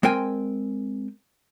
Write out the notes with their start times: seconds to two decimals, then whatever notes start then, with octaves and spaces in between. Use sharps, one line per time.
0.03 G#3 C4 A#4 G5 G#5